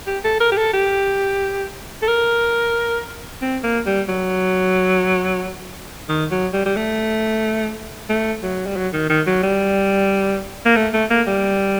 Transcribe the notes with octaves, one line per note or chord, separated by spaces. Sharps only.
G4
A4
A#4
G4
A4
G4
A4
A#4
C4
A#3
G3
F#3
D#3
F#3
G3
G3
A3
A3
F#3
G3
F#3
D#3
D#3
F#3
G3
A#3
A3
A3
A#3
G3